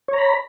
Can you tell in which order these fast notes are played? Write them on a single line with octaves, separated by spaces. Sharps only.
C#5 A#5 B5